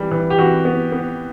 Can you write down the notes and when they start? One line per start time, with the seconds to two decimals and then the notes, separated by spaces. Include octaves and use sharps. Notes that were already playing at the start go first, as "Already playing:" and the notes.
Already playing: E3 G3
0.11 E3
0.30 G4
0.38 E3 F#4
0.65 B3
0.92 B3